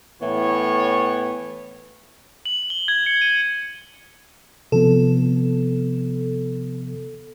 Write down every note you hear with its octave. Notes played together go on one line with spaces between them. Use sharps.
A2 E3 B3 C#5
F#7
G7
G#6
C#7
D#7
C3 F3 B3 A4